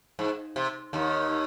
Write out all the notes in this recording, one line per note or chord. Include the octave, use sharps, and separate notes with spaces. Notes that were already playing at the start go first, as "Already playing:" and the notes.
G#2
C3
D#2 D#3